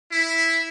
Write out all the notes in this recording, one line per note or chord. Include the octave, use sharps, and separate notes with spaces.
E4